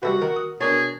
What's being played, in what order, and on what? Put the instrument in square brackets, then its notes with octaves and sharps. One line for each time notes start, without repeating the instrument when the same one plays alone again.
[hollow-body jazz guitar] C3 [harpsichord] G3 A4 B4 [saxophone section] F#4
[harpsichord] D#3 [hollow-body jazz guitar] A#4
[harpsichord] D#6
[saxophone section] B2 [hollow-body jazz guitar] D4 A#4 C#5 [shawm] G#4 [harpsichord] A5